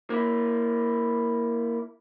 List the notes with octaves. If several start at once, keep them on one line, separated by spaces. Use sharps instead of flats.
A#3 E4